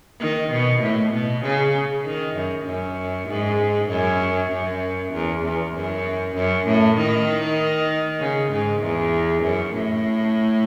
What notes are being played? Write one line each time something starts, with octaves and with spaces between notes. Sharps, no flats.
D#3
B2
A2
B2
C#3
D#3
F#2
F#2
G#2
F#2
F#2
E2
E2
F#2
F#2
A2
D#3
C#3
G#2
E2
F#2
A2